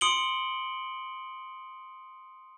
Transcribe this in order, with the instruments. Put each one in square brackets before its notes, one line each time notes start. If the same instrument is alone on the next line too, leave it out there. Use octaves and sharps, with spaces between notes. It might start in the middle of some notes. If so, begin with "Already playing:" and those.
[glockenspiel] C6 D#6 C#7 D7 F#7 G7